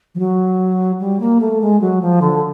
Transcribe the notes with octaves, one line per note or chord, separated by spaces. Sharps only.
F3
F#3
G3
A#3
A3
G#3
F#3
F3
D3